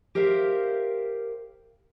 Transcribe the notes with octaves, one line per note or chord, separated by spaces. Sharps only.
G4 A#4 C5 E5 F5